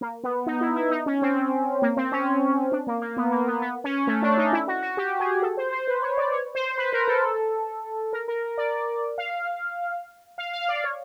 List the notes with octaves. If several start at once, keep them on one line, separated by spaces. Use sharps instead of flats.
A#3
B3
D#4
E4
E4
D#4
C#4
C4
A#3
C4
C#4
D4
A#3
A#3
B3
A#3
B3
B3
C#4
A3
D4
D#4
E4
F#4
F#4
G4
G#4
A4
C5
C5
B4
C#5
D5
C#5
C5
B4
A#4
A4
A#4
A#4
A#4
D5
F5
F5
F5
D5
C#5